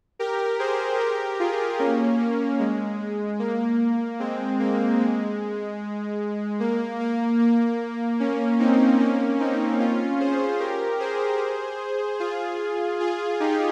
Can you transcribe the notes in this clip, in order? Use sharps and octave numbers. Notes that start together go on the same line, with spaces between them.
G4 A#4
G#4 C5
G4 A#4
F4 G#4
A#3 C#4
A#3
G#3
A#3
G#3 C4
A#3
G#3
A#3
A#3
A#3
A#3 C#4
C4 D#4
A#3 C#4
C4 D#4
C#4 F4
G#4 C5
G4 A#4
G#4 C5
F4 G#4
F4 G#4
D#4 G4